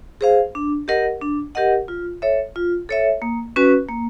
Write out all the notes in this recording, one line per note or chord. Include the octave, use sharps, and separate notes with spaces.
G#4 C5 F5
D4
G4 A#4 D#5 F#5
D4
G4 A#4 D#5 F#5
F4
A4 C#5 E5
F4
A4 C#5 E5
A#3
C#4 F#4 B4
A#3